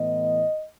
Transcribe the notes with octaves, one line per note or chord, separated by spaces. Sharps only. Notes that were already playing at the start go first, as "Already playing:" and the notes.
Already playing: A2 E3 B3 D#5